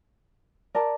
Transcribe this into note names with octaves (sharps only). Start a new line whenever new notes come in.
A#4 D5 A5